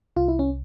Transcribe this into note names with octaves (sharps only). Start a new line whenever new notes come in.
C2 F4
E4
C#4